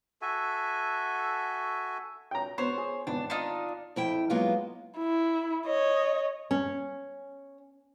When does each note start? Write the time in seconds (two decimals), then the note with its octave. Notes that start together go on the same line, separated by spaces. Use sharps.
0.22 F#4 A4 E5 G#5
2.31 G5 A#5
2.58 B3 C5 C#5
2.78 G#4
3.07 G#1 B3 D4
3.30 D4 D#4 F4
3.96 F2 E4 G5
4.30 F#3 G#3 A#3 B3 F4
4.98 E4
5.66 C#5 D#5
6.51 C#4